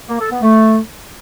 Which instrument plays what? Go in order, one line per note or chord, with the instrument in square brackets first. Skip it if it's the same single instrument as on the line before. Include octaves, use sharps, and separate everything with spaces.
[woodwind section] A#3
A4
B3
A3